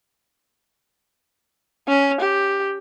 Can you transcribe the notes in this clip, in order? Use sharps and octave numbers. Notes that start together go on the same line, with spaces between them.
C#4
G4